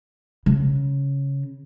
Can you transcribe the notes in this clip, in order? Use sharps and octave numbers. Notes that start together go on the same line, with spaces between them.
C#3